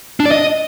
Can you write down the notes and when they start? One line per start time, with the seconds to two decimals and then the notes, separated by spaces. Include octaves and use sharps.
0.20 D4
0.26 D5
0.31 D#5